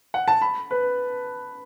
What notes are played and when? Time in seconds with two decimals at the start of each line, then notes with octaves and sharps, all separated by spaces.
0.14 F#5
0.28 A5
0.41 B5
0.71 B4